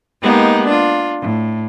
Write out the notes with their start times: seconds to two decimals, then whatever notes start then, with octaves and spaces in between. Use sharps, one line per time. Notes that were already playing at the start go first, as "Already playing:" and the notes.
0.22 G#3 A#3 B3 D#4 G4
0.66 D4 F4
1.21 A2